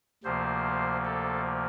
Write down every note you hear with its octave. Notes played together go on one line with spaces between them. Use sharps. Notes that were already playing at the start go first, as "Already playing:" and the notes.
D2 C3 F3 A#3 C5
A4